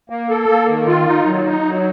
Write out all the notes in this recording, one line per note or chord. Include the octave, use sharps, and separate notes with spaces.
A#3
A4
A#3
D#3
F4
D#4
F#3
D#4
F#3